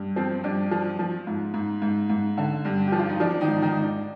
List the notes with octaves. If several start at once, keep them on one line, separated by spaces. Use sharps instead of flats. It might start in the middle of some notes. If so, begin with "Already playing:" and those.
Already playing: G2
F3 C4
G2 D4
F3
F3
G#2
G#2
G#2
G#2
D3
G2
F3 G4
F4
D#4
F3 D4
D4
D#3 D#4
G#2
D#3 D#4
G#2
D4